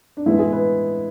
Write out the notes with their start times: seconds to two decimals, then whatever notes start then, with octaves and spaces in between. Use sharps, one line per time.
0.17 D4
0.26 A2 E3 G#3 B3 E4
0.39 G#4
0.52 B4